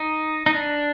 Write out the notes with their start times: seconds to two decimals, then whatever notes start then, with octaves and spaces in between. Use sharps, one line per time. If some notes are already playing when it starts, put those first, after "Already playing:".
Already playing: D#4
0.46 D#4
0.54 D4